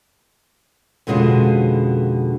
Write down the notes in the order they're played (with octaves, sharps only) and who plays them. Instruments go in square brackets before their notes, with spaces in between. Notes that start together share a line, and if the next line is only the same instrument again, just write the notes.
[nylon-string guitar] F2 B2 D3 G#3 C#4 F4